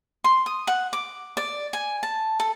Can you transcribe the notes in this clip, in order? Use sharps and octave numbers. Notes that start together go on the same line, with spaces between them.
C6
D#6
F#5
D6
D5
G#5
A5
A4